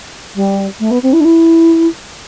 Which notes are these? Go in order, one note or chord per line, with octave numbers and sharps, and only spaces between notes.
G3
A3
B3
C4
E4
D4
E4